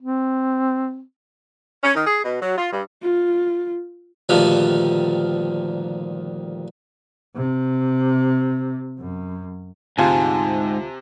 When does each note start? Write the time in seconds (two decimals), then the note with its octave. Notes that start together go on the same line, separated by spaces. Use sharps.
0.02 C4
1.84 C#4
1.95 D#3
2.07 G#4
2.24 B2
2.42 F#3
2.58 F4
2.73 G2
3.02 F4
4.29 D2 G2 A#2 D#3 F3
7.36 C3
8.99 F#2
9.98 D2 G#2 C3 F4 G#5 A5